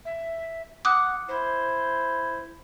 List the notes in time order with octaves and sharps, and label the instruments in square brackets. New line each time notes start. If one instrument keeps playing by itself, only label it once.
[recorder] E5
[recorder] F#5 [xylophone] D6 D#6 F#6
[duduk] E4 [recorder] C5